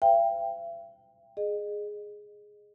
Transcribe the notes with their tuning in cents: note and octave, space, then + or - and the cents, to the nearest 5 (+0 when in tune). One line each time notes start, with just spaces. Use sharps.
C5 -35 E5 +45 G5 +15
G#4 +5 D#5 -25